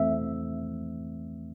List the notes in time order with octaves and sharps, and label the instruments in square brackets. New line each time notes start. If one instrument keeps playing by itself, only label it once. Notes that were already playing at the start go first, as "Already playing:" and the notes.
Already playing: [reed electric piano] E2 E3 A3 C4 E5